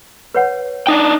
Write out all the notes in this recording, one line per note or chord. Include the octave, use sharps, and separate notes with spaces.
B4 C#5 F#5
D4 D#4 G5